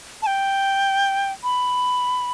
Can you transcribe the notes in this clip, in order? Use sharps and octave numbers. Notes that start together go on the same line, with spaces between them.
A5
G5
B5